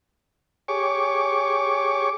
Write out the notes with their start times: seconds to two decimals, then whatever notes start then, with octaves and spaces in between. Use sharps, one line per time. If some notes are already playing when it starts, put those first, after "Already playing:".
0.68 G4 G#4 C#5 C#6 D6